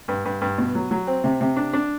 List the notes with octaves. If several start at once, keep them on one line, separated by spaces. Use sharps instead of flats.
G2
G2
G2
B2
F#3
F#3
C4
C3
C3
D4
D4